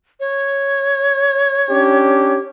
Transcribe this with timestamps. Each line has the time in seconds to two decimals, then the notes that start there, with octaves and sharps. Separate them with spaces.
0.20 C#5
1.69 C#4 D4 G4